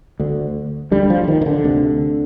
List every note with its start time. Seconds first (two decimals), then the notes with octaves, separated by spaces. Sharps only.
0.20 D2 D3
0.91 D2 D3 G3
1.10 F3
1.24 F3
1.28 D#3
1.41 D#3
1.46 D3
1.64 D2 C3